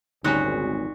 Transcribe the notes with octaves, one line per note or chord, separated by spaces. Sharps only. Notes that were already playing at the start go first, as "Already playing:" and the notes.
G#1 D2 A#2 G3 C#4 D#4 F#4